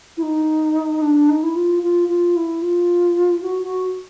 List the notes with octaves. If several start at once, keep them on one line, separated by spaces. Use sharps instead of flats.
E4
D#4
D4
D#4
E4
F4
F4
F4
E4
F4
F#4
F#4